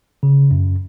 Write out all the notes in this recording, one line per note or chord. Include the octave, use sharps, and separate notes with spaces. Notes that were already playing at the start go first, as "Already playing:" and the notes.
C#3
F#2